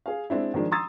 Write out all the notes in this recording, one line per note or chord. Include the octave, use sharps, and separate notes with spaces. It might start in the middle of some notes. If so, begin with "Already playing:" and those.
G#4 F5
G#3 C4 D4 E4
D#3 F3 G#3 D4
A#5 C6 D#6 E6 A6